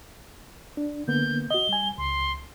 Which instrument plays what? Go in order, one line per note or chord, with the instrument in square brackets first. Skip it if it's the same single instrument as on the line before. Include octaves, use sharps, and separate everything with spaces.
[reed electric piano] D4
[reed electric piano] D3 A#3 B3 [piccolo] G6
[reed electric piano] F#4 D#5 [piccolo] G7
[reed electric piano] G3 G#5
[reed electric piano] C#2 [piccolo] C6